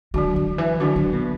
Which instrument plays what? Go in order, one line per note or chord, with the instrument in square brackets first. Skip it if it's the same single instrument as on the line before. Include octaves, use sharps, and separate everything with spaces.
[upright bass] D3 [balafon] F#3 D4 F#4
[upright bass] D3
E3
[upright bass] D3 [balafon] F#3 D4 F#4
[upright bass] D3
B2